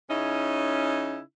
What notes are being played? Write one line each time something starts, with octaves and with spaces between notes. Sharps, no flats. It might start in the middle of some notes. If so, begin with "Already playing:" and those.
C#3 C#4 D#4 E4